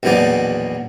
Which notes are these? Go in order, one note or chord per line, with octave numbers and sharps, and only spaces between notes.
A#1 E2 B2 F#3 D#4 D5